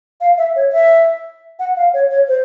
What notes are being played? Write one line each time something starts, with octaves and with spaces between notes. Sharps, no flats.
F5
E5
C#5
E5
F#5
F5
C#5
C#5
C5